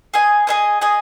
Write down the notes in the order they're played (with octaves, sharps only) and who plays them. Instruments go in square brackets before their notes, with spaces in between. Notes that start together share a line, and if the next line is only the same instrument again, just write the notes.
[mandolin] G#4 D#5 G#5
G#4 D#5 G#5
G#4 D#5 G#5